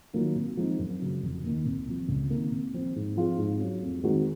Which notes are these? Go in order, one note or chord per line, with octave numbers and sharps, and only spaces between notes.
D#3 F#3 A#3 F4
C3
F3 G#3 C4 D#4
F#2
C#3 F#3
F1
D#2 D#3
C2
C3 F3
C#2
C3 D#3 A#3
C3
F3 C4
G#2
F3 C4 F4 G#4
G#2
F#3 C#4
F2
D#3 G#3 C4 F#4